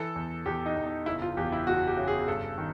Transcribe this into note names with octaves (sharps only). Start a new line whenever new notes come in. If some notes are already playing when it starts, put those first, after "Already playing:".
Already playing: E3 A4
E2
E2 G4
D#4
E2
D#4
F#1 E4
F4
E2 G4
E4
F#1 F#4
G4
C#3
G#4
G2 A4
D#3